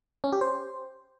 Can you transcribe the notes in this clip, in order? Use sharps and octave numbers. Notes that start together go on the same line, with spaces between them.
C#4
G4
C5